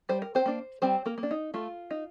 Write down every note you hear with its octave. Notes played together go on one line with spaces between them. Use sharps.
G3 C5
A#4
C4 C5
A#3 D4
G3 C4 C5
A#3 A#4
A#3
D4
D#4
A3 F4
D#4